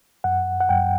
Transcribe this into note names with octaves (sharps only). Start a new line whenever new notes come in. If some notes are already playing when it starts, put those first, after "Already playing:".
F#2 F#5
F#5
F#2 G5